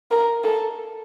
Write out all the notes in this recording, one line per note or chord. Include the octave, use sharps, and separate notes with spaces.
A#4
A4